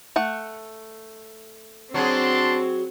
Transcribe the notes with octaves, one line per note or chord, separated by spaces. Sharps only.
A3 F#5
F#3 C4 D4 G#4 A5 C6